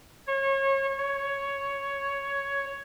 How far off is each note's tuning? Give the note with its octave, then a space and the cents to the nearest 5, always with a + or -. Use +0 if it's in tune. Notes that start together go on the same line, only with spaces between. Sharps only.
C#5 -30
C#5 +5